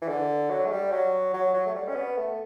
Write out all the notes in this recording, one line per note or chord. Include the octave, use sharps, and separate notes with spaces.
E3
D3
F#3
A3
G3
F#3
F#3
F#3
A3
G3
C#4
B3
A3